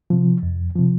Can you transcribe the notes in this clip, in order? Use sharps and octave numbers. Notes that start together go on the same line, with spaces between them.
C3 F3
F2
C3 F3